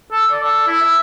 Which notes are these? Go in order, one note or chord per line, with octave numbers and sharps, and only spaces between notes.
A4
D5
A4
E4
E5